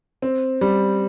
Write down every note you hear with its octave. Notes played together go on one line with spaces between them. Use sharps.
C4
G3